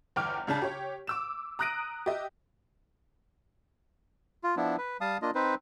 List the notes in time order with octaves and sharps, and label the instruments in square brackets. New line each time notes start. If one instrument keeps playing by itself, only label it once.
[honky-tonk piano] G1 E2 G5 D6 F6
C#2 C#3 D4 A5
G4 C#5
D6 E6 E7
A#5 D#6 F#6 A#6 D7 D#7
G4 D#5 E5
[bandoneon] F4
F3 B3 D4 E4
B4
G3 F5 A5 D#6
A#3 D4 F4 D#5
C4 D#4 B4 C5